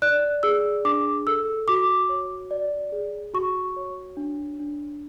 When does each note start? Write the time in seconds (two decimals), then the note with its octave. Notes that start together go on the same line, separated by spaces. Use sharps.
0.02 D5 F#6
0.43 G#4 E6
0.85 D4 D6
1.27 A4 E6
1.68 F#4 D6
2.09 C#5
2.51 D5
2.92 G#4
3.34 F#4 C#6
3.76 C#5
4.17 D4
4.60 D4